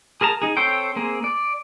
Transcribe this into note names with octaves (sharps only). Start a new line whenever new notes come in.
G#4 A#4 A5 A#5
D#4 G#4
C4 A4 C5 C#5 G5
A#3 C4 G#4
D5